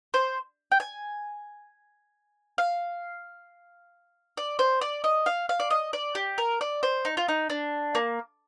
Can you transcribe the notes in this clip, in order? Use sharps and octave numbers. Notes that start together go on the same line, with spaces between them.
C5
G5
G#5
F5
D5
C5
D5
D#5
F5
F5
D5
D#5
D5
G4
A#4
D5
C5
D#4
F4
D#4
D4
A#3